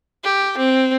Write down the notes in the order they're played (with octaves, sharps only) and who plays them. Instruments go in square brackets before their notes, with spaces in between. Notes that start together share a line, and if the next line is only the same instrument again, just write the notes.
[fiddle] G4
C4